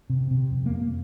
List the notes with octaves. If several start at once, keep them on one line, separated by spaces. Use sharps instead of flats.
C3
C3
F2
A#3
F2
A#3